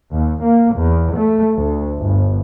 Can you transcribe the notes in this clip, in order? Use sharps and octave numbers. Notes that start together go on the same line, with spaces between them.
D#2
A#3
E2
A3
D2
G1